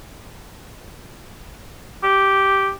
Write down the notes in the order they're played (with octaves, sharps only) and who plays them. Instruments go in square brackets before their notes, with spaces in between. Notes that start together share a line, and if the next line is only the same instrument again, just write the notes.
[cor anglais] G4